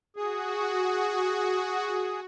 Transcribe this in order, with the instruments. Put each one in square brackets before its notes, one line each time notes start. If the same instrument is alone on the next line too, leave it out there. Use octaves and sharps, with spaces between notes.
[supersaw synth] F#4 [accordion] G#4